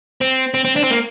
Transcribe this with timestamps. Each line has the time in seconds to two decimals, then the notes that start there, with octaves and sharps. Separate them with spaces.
0.21 C4
0.54 C4
0.65 C4
0.76 D4
0.84 C4
0.90 A#3